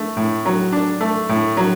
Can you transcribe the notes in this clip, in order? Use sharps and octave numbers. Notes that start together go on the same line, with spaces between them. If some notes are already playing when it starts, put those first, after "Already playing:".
Already playing: A3
A2
F#3
D4
A3
A2
F#3